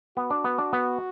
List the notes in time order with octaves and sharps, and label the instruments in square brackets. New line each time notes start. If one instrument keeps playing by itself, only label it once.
[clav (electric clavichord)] B3 [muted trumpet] F#4
[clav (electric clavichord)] D4
B3
D4
B3